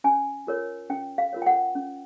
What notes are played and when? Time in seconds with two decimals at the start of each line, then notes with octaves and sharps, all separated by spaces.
0.04 C#4 G#5
0.47 F4 A#4 C#5
0.90 C#4 G5
1.18 F5
1.33 F4 A#4 C#5
1.42 G5
1.46 F#5
1.75 C#4